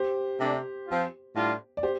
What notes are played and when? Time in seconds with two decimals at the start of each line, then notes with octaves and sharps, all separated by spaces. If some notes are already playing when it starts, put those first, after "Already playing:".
Already playing: G4 C5
0.39 C3 A3 D4
0.87 F3 C4 F4
1.35 A2 G3 D4 F4
1.77 D5
1.83 G4 C5